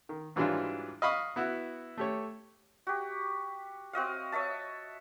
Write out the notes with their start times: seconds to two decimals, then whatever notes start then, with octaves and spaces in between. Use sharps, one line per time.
0.09 D#3
0.36 G#2 E3 F#3 G3 D4 F4
1.02 D#5 F5 B5 C#6 D#6
1.36 B3 E4 F#4
1.98 A3 G4 C#5
2.87 F#4 G4
3.93 C4 F#4 D#5 F5
4.32 C#5 D#5 E5 A5